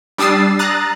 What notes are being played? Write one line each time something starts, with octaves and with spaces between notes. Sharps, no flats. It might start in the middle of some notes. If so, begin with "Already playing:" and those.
G3 D4 D#6 E6 A6 C7
A#5 D#6 F#6 A6